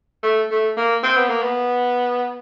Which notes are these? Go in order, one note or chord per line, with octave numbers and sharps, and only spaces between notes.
A3
A3
A#3
C4
B3
A#3
B3